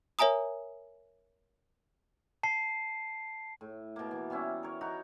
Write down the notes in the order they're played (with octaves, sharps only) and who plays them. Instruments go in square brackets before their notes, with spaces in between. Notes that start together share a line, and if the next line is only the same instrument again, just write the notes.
[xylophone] A#4 C#5 E5 G#5 A#5 D#6
[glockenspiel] A5 C7
[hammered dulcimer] A2
B2 A#3
E3
G3 B3 C#4 E4
A#4 C#5
D#4 F#4 A#5 B5